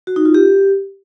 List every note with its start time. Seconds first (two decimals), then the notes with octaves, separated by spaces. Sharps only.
0.07 F#4
0.16 D#4
0.25 F4
0.34 G4